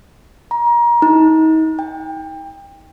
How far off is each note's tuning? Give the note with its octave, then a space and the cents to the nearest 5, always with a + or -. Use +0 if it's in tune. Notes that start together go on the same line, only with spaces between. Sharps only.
A#5 +25
D#4 +35
G5 +25